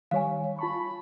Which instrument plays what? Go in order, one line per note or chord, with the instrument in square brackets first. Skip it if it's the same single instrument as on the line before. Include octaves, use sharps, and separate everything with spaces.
[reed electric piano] D#3 G3 C#5 [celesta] F5 G#5
[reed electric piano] F4 C#6 [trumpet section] A5 B5